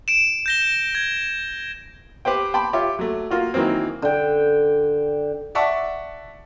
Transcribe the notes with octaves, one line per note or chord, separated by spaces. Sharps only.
D7 E7
G6 A#6 G7
G#6
G4 B4 C5 G5
G5 A5 B5 C6 D6
F4 G4 C#5 E5
F#3 A3
A#3 F4 F#4
D#3 E3 F#3 A#3 C4
D3 G5
D5 E5 F#5 A5 C#6